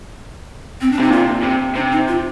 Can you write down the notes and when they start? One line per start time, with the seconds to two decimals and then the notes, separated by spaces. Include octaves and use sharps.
0.81 C4
0.92 D4
1.00 C3 D#4
1.11 A#2 F4
1.43 C3
1.75 C3 D4
1.92 D#4
2.08 F4